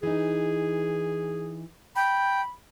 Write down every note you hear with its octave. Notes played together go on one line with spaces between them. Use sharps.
E3 D#4 G#4
G5 B5